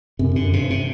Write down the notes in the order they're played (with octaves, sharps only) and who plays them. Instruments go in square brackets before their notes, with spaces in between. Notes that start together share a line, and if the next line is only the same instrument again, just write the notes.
[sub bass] F#2 [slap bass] C3
[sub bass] F#2 [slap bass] D3
[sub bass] G2 [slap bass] C3
[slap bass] C3